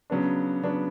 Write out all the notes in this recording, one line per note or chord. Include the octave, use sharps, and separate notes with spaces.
C#3 F#3 B3 D4
C#3 F#3 B3 D4